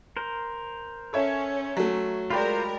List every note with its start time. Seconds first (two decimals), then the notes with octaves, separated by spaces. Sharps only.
0.17 A#4 C5
1.13 C#4 A4 C#5 E5
1.77 F#3 A3
2.30 G#3 F4 G4 A#4 C5 D5 G5 B5